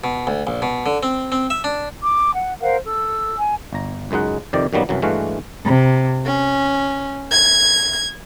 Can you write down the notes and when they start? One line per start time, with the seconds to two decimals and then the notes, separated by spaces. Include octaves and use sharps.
0.04 B2
0.27 D2
0.47 A#1
0.62 B2
0.86 D3
1.03 C4
1.32 C4
1.50 E5
1.64 D4
2.03 D6
2.34 F#5
2.61 A#4 C5 F5 F#5
2.86 A4 E6
3.38 G#5
3.73 G1 A#5
4.11 C#2 F#2 G#3 D#4 F#5
4.53 F2 C3 D#3 D5 G5
4.73 F#2 D#3 F#3 G3 A#3 B3
4.89 C2 F#2 E3 F#3
5.02 G2 E3 G#3 A3 F#4 F5
5.65 C3
6.25 C#4
7.31 G#6